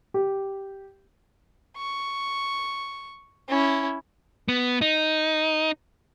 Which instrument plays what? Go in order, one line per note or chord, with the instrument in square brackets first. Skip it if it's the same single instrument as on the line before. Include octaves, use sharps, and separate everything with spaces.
[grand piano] G4
[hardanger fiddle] C#6
C#4 E4
[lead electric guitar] B3
D#4